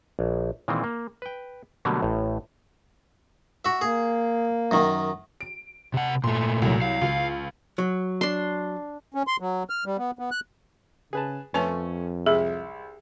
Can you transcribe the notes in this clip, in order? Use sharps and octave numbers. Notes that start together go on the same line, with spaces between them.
A#1
A#2 D#3 E3 G#3 C4
A#3
B4 G5
B2 D3 F#3 G3 A3 A#3
A1 A2
F#4 E5
A#3 G#4
F#2 D#3
D7
C3 F#5
A#2 A3 C6
C2 F#3
F5
C#2
F#3
D4 C6
C#4
C6
F#3
F6
G3
B3
B3
F#6
C#3 G#4 B4 A5
F2 F3 A3 C#4 B4 G#5 A5
C2 G#3 G#4 E5